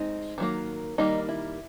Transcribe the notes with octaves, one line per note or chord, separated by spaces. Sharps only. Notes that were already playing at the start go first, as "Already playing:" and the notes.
Already playing: G#3 C4 D#4
D#3 F#3 A#3
D#3 G3 A#3 D#4
E4